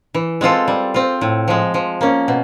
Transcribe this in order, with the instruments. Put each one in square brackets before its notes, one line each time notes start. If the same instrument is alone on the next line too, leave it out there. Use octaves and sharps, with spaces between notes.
[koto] E3
G#3 C4 F4 A4
G3
C4 F4
A2
F3 G#3
F3
A#3 C#4
B2